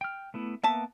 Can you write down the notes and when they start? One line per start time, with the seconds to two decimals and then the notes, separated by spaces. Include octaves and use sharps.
0.01 G5 F6
0.34 A3 B3 E4
0.63 A#3 B3 E5 A5